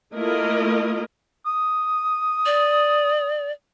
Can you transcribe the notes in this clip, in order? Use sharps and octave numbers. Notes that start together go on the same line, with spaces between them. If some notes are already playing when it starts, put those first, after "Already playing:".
A3 A#3 E4 F4 A#4 D#5
D#6
D5